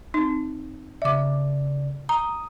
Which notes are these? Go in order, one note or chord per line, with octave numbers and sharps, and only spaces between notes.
C4 D#4
C#3 D5 E5 D6
A#5 D#6